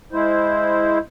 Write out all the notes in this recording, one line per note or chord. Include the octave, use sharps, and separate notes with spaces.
G#3 E4 C5